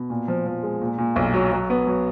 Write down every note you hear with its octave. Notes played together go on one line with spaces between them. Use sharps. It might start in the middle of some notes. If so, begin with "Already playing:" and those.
Already playing: B2
A#2
F3
F3
G#3
A#2
A#2
B1
F#3
F#3
B3
F#3